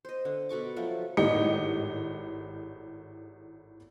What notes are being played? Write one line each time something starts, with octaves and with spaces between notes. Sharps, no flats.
C5 D#5
D3
B2 A4 C#6 D6
F3 F#3 A3
G#1 A2 G4 D#5 C#7